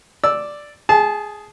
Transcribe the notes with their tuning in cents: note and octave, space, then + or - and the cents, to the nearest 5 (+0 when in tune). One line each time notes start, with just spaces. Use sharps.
D5 +0 E6 +0
G#4 +0 A5 -30